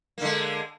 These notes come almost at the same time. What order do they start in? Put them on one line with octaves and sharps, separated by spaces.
A#3 D3 G#3